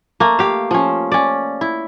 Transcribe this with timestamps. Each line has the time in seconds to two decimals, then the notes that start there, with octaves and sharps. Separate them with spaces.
0.20 A3 A#3
0.39 G4 F5
0.71 F3 C#4
1.12 C#4 D5
1.61 E4